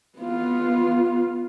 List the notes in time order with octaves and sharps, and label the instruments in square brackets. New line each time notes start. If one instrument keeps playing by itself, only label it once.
[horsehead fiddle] B3 F4